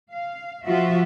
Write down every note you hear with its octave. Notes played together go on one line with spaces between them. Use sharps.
F5
F3 F4 F#4 E5